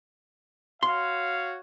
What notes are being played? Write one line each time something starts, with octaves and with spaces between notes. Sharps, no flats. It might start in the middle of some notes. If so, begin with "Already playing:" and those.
F#4 C#5 F5 C6